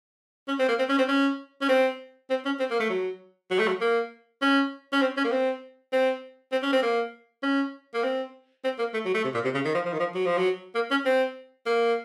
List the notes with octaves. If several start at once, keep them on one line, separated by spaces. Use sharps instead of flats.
C#4
C4
A#3
C4
C#4
C4
C#4
C#4
C4
C4
C#4
C4
A#3
A3
F#3
F#3
A3
F#3
A#3
C#4
C#4
C4
C#4
A#3
C4
C4
C4
C#4
C4
A#3
C#4
A#3
C4
C4
A#3
A3
F#3
A3
C3
A#2
C3
C#3
D#3
F3
F3
D#3
F3
F#3
F3
F#3
A#3
C#4
C4
A#3